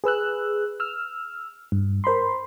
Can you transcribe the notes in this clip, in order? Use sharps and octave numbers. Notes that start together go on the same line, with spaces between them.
G#4 B4 E6 F#6
E6 F6
G2
A#4 C5 B5 C6